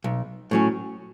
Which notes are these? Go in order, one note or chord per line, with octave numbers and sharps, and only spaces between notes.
B1
A2 F#3 C#4